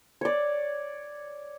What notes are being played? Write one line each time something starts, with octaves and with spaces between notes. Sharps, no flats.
C#5 D5